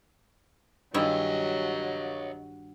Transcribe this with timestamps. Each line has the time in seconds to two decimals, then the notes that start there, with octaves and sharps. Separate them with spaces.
0.94 G2 D#3 F#3 E4 G#4 C#5 D#5